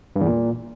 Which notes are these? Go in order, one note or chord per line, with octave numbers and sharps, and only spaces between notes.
G2
E2
A#2